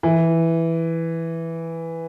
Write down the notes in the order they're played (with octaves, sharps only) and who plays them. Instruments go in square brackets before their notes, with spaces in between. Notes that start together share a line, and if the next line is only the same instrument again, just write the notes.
[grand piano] E3